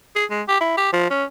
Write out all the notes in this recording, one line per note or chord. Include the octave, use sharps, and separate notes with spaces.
G#4
G#3
G4
E4
G4
F3
C#4